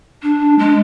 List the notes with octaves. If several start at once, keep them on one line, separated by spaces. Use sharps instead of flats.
D4
G#3